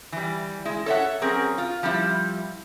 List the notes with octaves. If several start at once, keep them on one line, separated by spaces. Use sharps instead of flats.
E3 G3
G#3 E4
A4 C#5 D#5 E5 F#5
F#3 C4 C#4 G#4 A#4
F4
F3 G3 C4 E4